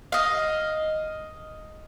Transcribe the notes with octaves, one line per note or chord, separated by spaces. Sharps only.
D#5 F5